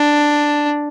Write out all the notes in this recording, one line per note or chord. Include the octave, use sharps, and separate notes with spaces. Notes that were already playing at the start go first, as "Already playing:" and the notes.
Already playing: D4